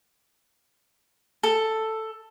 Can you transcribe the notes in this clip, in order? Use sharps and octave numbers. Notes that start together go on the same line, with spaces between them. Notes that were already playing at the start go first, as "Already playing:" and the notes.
A4